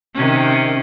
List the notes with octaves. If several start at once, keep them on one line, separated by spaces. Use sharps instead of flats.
C3 D#3 C#4